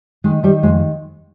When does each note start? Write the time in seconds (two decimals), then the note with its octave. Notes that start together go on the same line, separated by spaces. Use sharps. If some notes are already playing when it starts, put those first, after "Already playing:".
0.24 D#3 G#3
0.43 D#3 G3
0.63 F2 G#3